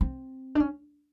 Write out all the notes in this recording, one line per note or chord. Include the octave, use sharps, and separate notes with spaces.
C4
D4
C#4